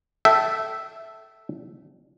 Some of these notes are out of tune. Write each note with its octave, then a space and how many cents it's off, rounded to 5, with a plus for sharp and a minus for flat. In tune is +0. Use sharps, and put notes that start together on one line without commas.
A4 +0 E5 +0 G5 -35